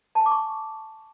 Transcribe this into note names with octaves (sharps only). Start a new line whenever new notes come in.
A5
G#5
D6
C#6